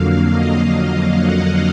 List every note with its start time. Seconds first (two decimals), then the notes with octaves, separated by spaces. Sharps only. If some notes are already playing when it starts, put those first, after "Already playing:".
Already playing: F2 D3 F#3 A#3 F5
0.30 D#5
0.75 F5
1.20 F#5